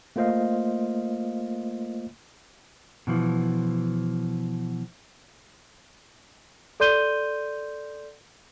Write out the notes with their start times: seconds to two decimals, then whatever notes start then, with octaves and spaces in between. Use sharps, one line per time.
0.16 A3 A#3 F4 C5 D#5 F5
3.07 B2 E3 F3
6.80 A4 D5 C6 G6 D#7 G7